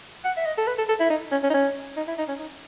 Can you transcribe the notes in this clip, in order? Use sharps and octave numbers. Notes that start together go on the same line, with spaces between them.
F#5
E5
D#5
A4
B4
A4
A4
E4
D#4
C#4
C#4
D#4
C#4
D#4
E4
D#4
C#4
D#4